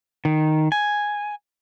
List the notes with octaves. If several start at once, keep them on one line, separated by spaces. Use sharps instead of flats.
D#3
G#5